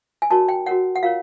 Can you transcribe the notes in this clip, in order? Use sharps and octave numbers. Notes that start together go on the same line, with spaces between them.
G#5
D#4 F#4 A#4 C#5 A5
G5
F#4 A#4 C#5 F#5
F#5
F4 A#4 C#5 F5